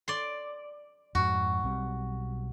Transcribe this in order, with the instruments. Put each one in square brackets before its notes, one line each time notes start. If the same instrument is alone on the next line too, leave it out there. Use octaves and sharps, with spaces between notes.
[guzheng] D5 C6
[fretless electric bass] F2 G#2 [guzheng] F#4
[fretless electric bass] B1 G3 C4